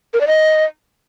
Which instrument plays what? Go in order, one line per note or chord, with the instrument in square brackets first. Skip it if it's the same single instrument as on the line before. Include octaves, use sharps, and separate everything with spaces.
[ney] A#4
D5
D#5